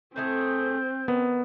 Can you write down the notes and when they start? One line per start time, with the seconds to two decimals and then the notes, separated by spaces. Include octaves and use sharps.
0.16 A2 A3 C4 G#4 G6
1.08 D#3 B3